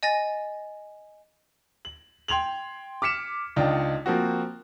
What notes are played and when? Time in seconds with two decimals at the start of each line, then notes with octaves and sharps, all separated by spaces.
0.03 D#5 G#5 A6 A#6
1.85 F#7
2.28 G5 C6 G#6 F7 F#7
3.02 D6 F6 B6 C#7 E7
3.56 C#2 D4 D#4 F4 G5
4.06 F3 A#3 C4 F#4